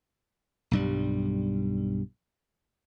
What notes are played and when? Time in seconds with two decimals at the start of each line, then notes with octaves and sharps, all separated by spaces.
0.71 B1 G2 G3